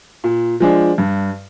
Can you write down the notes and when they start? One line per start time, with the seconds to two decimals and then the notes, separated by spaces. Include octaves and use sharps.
0.24 A#2
0.60 F3 G#3 D4
0.98 G2